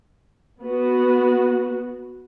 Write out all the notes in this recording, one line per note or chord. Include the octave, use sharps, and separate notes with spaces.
B3 F#4